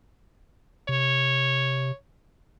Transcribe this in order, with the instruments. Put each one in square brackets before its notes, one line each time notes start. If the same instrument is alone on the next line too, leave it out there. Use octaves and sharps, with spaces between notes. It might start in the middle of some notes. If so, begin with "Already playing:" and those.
[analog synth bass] C3 [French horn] C#5